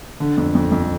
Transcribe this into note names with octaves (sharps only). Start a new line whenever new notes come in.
D3
F2
F2
F2